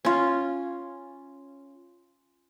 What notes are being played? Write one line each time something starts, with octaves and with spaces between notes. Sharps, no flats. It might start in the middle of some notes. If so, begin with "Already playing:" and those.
C#4 F4